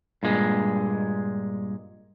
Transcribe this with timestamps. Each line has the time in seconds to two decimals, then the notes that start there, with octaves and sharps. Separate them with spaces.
0.23 G2 A#2 G#3